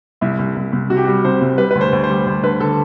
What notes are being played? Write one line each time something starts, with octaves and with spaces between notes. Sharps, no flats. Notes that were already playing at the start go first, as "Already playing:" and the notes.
C2 E4
C2
C2
C2
C3 F#4
G4
G3 F#4
C3 C5
C2
G3 B4
D2 B4
C5
D2
C5
G3
D2 C5
D3 B4
D3 A4